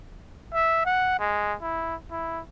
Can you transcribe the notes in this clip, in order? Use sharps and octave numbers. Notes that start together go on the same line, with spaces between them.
E5
F#5
G#3
E4
E4